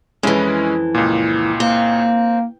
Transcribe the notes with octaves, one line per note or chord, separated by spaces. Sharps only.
F2 E3 G#3 C#4 E4
C#2 A#2
A#3 C4